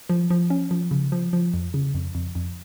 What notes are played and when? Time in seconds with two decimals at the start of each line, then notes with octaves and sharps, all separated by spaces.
0.09 F3
0.30 F3
0.50 C#4
0.71 F3
0.91 C#3
1.12 F3
1.33 F3
1.54 F2
1.74 C#3
1.94 F2
2.15 F2
2.35 F2